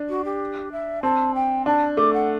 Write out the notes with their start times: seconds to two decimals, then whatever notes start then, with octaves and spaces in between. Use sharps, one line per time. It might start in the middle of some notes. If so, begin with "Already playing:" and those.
Already playing: D4
0.09 F#4
0.25 G4
0.72 E5
1.03 C4 A5
1.35 G5
1.66 D4 A5
1.97 A3 D6
2.13 F#5